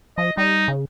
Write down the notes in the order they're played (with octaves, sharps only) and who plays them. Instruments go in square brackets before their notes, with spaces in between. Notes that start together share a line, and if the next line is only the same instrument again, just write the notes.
[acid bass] F3 [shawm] D#5
[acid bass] G3 [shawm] D#4
[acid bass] C#3